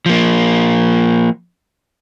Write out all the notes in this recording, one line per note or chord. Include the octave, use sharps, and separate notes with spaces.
F3 A#3